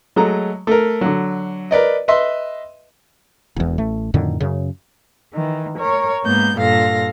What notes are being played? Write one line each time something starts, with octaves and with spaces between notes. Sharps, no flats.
F#3 G#3 A3 A#5
A3 A#4
D3 F#3
A#4 B4 D5 D#5
B4 D#5 E5 C6
E1 E2
A1 A3
F2 A2 D3 D#3
F#2 C#3
D#3 E3
A#4 C#5
G#2 A#3 B3 G6
G2 A#2 A4 F5 A#6